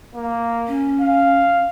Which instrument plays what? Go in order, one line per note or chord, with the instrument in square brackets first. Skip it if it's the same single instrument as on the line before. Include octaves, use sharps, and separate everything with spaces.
[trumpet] A#3
[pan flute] C#4
[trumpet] F5